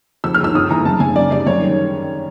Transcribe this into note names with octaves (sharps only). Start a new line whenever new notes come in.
F2 E6
F6
G1 E6
G1 D#6
E3 A#5
F#2 A5
F#2 G#5
C#3 D5
G3 D5
F#2 C#5
D#3